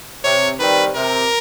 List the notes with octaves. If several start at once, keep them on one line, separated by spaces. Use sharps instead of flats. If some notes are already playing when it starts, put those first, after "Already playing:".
C3 C#5
D#3 G3 C4 B4
C3 A#4